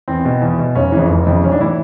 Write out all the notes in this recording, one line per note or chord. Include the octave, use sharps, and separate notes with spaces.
E2 C4
B2
E2
B2
F1 C#4
F2 C#3 E3
F1
F2 C#3 E3
B1 C#4
D4
A2 E3 E4